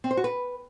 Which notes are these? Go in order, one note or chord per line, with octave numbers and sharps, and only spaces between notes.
C4
C5
F#4
B4